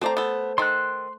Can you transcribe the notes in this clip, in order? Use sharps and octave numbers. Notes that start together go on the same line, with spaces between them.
A3 C4 C5 D5 A#5
B3 A4
D#3 A4 C6 F#6